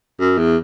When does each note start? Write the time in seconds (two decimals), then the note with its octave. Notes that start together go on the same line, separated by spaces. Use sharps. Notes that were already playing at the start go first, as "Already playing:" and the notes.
0.20 F#2
0.38 E2